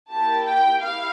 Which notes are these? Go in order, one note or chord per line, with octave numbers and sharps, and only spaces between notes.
A#3 E4 G4 A5
G5
E4 G4 F5